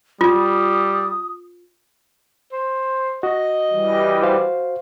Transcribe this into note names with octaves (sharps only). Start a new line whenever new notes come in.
G3 F4 D#6
C5
F#4 D#5
E3 G3
F#4 C5 F5